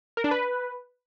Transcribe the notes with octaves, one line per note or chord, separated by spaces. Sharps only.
A#4
D4
B4